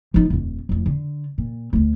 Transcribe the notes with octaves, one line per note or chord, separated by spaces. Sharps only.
F3 D#4
D#1 F2
F2 A2
D3
A#2
D2 A3